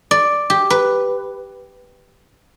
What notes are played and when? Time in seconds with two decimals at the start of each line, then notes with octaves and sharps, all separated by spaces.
0.11 D5
0.50 G4
0.70 B4